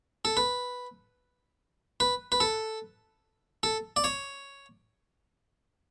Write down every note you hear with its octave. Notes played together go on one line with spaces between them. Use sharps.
A4
B4
B4
B4
A4
A4
D5
C#5